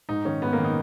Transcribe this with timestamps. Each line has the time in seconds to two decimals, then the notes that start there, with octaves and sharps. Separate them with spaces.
0.09 G#2 D#4
0.25 D#3 C#4
0.42 G#2 B3
0.53 A#3
0.58 D#3
0.64 D#4